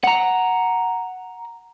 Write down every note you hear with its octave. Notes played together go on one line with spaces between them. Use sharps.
F#5 A#5